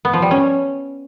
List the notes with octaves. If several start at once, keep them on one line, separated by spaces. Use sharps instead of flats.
B3
F3
G3
C#4